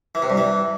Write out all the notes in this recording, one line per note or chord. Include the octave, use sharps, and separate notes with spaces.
E3
C3
G2
E3